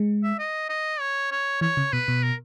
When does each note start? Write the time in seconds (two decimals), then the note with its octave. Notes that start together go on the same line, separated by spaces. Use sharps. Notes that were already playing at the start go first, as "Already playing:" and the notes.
Already playing: G#3
0.23 E5
0.39 D#5
0.69 D#5
1.00 C#5
1.31 C#5
1.61 E3 C#5
1.77 C#3
1.92 B2 B4
2.08 B2
2.23 A#4